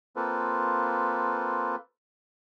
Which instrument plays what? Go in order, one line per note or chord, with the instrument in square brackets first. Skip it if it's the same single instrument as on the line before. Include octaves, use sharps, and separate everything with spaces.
[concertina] A#3 C4 F4 A4 B4